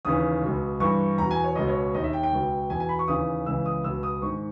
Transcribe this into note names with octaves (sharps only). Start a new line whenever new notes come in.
D#2 C#3 E3 D#6
C#2 B2
G2 E3 C#6
E2 B2 A#5
G#5
C#5
C#2 B2 D#5
C#5
D#2 D#3 D#5
E5
G5
G5
C#2 B2
E2 B2 G#5
G#5
B5
C#6
D#2 C#3 E3 D#6
C#2 C#3 E3 E6
D#6
C#2 B2 E6
D#6
G#2 D#3 C#6